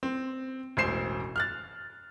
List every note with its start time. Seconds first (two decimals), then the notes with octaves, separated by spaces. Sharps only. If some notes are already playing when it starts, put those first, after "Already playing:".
0.03 C4
0.77 E1 A1 C5 C7 E7
1.36 F6 F#6 A6